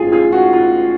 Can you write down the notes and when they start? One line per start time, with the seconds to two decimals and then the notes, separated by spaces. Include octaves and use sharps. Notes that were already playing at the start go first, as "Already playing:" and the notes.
Already playing: A1 G#2 F4 G#4
0.12 F4 G#4
0.32 F#4
0.53 F4